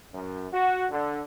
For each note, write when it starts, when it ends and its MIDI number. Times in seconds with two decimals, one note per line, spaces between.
0.13 0.46 42
0.52 0.84 66
0.90 1.20 50